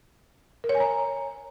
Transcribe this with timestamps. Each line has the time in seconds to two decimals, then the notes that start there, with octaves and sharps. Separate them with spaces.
0.64 A#4
0.69 C#5
0.75 G#5
0.80 A#5